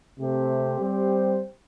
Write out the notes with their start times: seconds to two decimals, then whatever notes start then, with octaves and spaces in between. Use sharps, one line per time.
0.19 C3 A3 C4 G4 C5
0.80 G3 C4 G4 C5